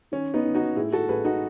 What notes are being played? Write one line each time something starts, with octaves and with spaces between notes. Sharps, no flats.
D#3 C#4
B3 D#4
D#3
D#4 F#4
A2 E4 G#4
F#4 A4
A1 G#4 B4
D#4 F#4